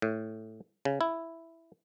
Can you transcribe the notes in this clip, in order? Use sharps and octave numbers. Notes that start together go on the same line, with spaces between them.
A2
C#3
E4